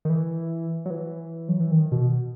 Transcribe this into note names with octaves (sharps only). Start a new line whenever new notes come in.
D#3
E3
F#3
E3
F#3
E3
D#3
B2